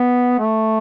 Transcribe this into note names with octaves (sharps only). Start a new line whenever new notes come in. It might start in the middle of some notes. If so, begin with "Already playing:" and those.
Already playing: B3
A3